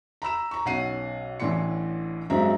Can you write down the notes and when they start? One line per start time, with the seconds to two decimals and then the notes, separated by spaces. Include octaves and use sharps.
0.22 A#5 B5 E6 E7
0.51 A#5 C#6
0.65 B1 C#4 F#5 C7 D#7
1.40 A1 A2 E3 D4 C6 C#7
2.30 G2 F#3 G#3 C4 E5 A#5